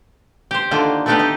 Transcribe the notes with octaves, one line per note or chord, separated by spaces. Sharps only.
G4 C5
D3 D#3 A#3 F4
A3 B3 D4 D#4 G4 B4
D#4